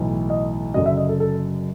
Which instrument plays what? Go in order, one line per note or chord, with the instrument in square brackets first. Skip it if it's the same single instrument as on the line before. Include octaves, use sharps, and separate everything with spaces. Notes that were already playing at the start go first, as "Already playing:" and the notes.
Already playing: [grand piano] B1 A2 E3
D#5
F#1 F#2 D3 F#3 D#5
E5
D#5
A4
A4